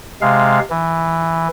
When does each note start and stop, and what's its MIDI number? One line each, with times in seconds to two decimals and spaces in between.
0.21 0.60 48
0.21 0.60 56
0.21 0.60 77
0.70 1.48 52